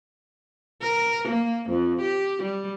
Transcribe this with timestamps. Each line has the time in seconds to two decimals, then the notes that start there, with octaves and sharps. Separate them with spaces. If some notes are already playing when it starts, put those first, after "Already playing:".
0.81 A#4
1.28 A#3
1.69 F2
2.01 G4
2.42 G3